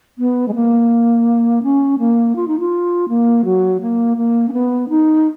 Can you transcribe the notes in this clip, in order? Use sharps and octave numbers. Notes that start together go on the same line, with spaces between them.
B3
G#3
A#3
C#4
A#3
F4
D#4
F4
A#3
F#3
A#3
A#3
C#4
B3
D#4